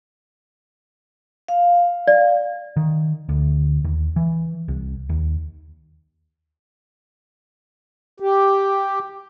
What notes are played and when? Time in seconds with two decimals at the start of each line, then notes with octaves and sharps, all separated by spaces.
1.48 F5
2.07 D5
2.77 D#3
3.29 D2
3.85 D#2
4.16 E3
4.68 C2
5.09 D#2
8.20 G4